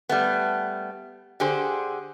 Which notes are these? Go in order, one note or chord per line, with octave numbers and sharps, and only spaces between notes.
G3 A3 B3
D3 G4 G#4 C5